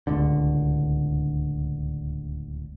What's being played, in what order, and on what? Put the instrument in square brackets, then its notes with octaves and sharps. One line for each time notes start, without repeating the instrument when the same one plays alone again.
[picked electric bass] D1 C#2 D3